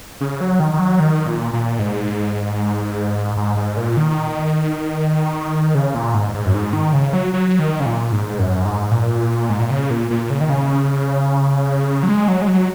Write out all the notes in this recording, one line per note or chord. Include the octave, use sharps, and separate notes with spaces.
C#3
F#3
D#3
D#3
F#3
D#3
A#2
A#2
G#2
G#2
G#2
A#2
D#3
C#3
A#2
G#2
G#2
F#2
G#2
D#3
C#3
F#3
F#3
D#3
C#3
A#2
G#2
F#2
G#2
A#2
G#2
A#2
C#3
A#2
A#2
C#3
D#3
C#3
F#3
G#3
F#3
G#3
F#3